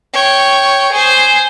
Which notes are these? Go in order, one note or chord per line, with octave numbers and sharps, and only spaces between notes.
C#5 G5
G#4 C5